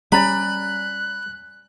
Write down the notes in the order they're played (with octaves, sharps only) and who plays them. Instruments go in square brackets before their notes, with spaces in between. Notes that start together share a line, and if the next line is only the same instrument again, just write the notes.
[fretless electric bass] G3 C#4 [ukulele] D5 G#5 A#5 [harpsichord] B5 [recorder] F#6